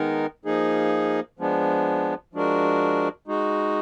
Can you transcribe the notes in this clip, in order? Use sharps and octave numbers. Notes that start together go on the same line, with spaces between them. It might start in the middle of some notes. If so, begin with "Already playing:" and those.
Already playing: D#3 G#3 B3 D#4 A#4
F3 A#3 D#4 G#4
F3 G#3 B3 D4
F3 G#3 D4 F#4 A#4
G#3 D#4 F#4